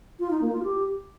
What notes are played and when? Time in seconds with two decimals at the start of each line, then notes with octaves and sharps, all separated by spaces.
0.20 F4
0.31 D#4
0.41 A#3
0.52 F4
0.63 G4